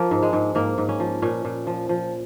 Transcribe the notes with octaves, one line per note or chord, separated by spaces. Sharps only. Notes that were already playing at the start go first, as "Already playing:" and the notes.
Already playing: F3 A#3
G#2
G#3
G#2
G#2 A#3
G#2
C#4
F3
A#2 C#4
A#2
F3
F3